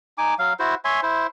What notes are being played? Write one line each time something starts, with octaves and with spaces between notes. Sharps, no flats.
D#4 G#5 D6
F#3 F5
E4 F#4 C5
C#5 E5 G#5 C6
E4 C5